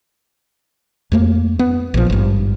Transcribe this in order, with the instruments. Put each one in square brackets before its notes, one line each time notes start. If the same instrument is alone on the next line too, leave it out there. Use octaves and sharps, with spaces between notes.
[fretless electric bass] F2 A3 A#3
B3
A#1 A#2 F3
G#1 G2